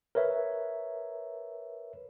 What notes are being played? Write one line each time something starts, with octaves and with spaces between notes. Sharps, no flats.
A#4 B4 C#5 E5